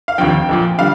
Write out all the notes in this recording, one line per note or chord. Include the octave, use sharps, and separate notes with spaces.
F5
F1 D#2 D3 F3 G5
A#1 A#2 F3
D3 G3 F5